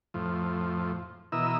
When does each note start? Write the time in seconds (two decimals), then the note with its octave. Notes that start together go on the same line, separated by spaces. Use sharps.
0.14 F2 A2 F3
1.32 B2 E3 E4 A#4 D#5 E6